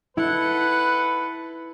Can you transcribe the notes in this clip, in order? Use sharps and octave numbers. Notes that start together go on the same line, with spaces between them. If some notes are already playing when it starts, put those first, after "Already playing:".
E4 A4 B4 F#5